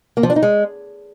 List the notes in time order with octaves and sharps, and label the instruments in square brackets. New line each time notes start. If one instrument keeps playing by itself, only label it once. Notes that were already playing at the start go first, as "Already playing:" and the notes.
[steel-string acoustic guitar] A#3
F3
D4
D#4
G#3